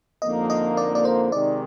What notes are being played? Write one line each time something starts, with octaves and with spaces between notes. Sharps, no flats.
F2 D3 F3 A#3 D#4 D#5
D#5
D5
D5
C5
C3 D#3 G#3 D#4 D5